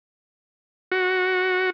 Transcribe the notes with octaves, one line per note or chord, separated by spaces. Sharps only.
F#4